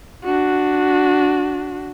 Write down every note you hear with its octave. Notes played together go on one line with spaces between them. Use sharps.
D4 F#4